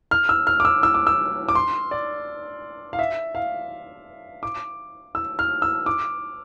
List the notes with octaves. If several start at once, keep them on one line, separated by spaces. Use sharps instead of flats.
F6
E6
F6
D6
E6
E6
D6
E6
D6
C6
D5
F5
E5
F5
D6
E6
F6
E6
D6